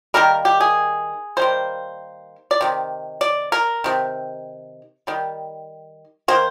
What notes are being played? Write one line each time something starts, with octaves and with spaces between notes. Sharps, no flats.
D#3 G3 A#3 A#4
G4
G#4
D#3 G3 A#3 C5
D5
C3 D#3
D5
A#4
C3 D#3
D#3 G3
D#3 A#3 C5